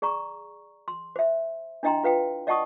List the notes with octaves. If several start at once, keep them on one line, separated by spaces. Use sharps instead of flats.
G#4 D5 A#5 C#6
C6
C5 E5
D4 E4 D#5 G5 A#5 C6
F4 B4 F5 G5
D5 D#5 F#5 A5 C#6 D#6